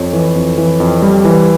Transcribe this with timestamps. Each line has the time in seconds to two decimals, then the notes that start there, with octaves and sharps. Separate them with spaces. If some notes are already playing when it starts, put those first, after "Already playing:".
Already playing: F2 A4 C#5
0.13 E3
0.36 F2
0.58 E3
0.80 F2
1.02 G3
1.25 E3